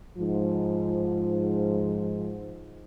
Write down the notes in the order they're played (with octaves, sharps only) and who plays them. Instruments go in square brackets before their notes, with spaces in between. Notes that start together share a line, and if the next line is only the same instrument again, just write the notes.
[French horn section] G#2 F3